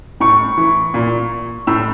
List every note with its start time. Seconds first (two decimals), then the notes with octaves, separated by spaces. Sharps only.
0.20 A2 C#6
0.57 E3
0.94 A#2
1.67 A2 E6